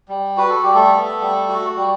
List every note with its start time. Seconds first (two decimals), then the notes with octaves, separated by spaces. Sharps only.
0.09 G3
0.37 F#4 B4
0.49 A4
0.62 G3 G4
0.75 A3 A4
0.93 B3
1.21 G3
1.49 F#4
1.76 G3